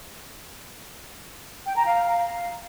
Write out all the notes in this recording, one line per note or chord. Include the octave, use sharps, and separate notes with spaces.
G5
A#5
F5